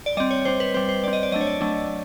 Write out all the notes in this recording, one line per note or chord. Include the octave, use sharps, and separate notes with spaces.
D5
G3 C4 D#5
C#5
G3 C4 C5
B4
G3 C4 C5
C5
G3 C4 D5
D#5
D5
F#3 A3 D4 D#5
C#5
D5
F#3 A3 D4